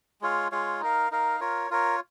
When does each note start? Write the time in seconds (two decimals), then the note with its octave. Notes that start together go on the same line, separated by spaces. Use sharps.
0.21 G#3 F4 C#5 F5
0.52 G#3 F4 C#5 F5
0.81 D#4 A#4 F5
1.11 D#4 A#4 F5
1.40 F4 A#4 C#5
1.71 F4 A#4 C#5